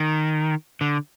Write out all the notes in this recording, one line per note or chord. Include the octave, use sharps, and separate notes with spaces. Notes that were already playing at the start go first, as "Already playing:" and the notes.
Already playing: D#3
D3